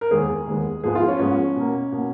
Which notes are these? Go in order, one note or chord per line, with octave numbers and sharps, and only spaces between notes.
A#4
D#2 D#3 G#3 B3 G#4
D#2 D#3 G#3 B3
G#2 F3 G#3 B3 G#4
F4
C#4
G#2 F3 G#3 B3 C#4
B2 A#3
B2 A#3